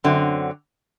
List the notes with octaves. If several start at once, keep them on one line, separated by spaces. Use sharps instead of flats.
F#2 D3 F#3 C4